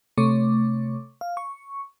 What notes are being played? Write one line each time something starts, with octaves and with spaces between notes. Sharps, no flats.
C3 A3 C#5 C#6 D6
F5
C#6